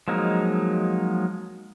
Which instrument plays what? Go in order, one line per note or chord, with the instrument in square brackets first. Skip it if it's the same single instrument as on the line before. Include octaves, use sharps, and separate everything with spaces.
[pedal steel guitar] F3 F#3 G#3 A#3 D#4